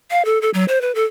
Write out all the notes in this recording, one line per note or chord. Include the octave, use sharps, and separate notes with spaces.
F5
A4
A4
F#3
C5
B4
A4